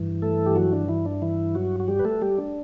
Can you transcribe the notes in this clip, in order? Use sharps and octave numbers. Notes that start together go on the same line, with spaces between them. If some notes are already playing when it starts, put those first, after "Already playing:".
Already playing: G2 E3
A3 A4
G4
F#3 F#4
D4
E3 E4
D4
E3 E4
F#3 F#4
F#4
G3 G4
B4
A3 A4
G3 G4
D4